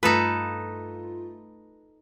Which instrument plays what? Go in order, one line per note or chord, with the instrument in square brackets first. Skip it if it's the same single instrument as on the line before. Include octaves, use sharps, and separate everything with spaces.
[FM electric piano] G2 A3 F4 [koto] D#4 A4 B4